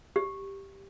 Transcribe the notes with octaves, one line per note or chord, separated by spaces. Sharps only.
G4